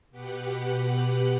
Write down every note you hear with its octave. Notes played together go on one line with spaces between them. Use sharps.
B2 G4 B4 F#5 F#6